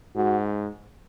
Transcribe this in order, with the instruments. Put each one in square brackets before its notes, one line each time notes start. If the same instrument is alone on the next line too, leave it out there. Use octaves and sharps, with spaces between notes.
[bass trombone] G#2 [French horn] F#4